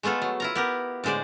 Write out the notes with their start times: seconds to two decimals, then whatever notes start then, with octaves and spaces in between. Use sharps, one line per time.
0.03 G#3 A3 B3 F4 A4
0.22 F#3
0.40 E4 F4 A#5
0.55 B3 G4 A#4
1.04 A2 D3 G#3 C5 D5